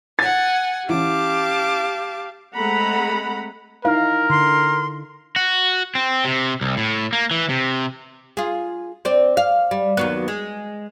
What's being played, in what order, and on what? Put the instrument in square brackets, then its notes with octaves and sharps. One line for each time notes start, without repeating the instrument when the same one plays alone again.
[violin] F#5 G#5 [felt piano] A6
[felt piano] E3 C#4 [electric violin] G4 F5 [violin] A5 D6
[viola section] G#3 A3 C4 F#5 A#5 B5
[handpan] D#4 E4 F5 [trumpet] A#4
[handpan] D3 [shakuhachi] C6
[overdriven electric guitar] F#4
C4
C3
C2
A2
A#3
E3
C3
[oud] F4 G#4
C4 D5
F5
G3
D#2 F#3 B3
G#3 G#4